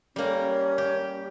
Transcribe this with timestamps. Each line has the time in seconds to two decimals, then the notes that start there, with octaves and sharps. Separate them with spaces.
0.16 G3 A#3 C#4
0.78 G4